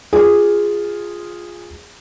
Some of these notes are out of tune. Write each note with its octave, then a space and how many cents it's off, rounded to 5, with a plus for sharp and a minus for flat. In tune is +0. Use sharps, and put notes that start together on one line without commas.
F4 +0 G#4 -10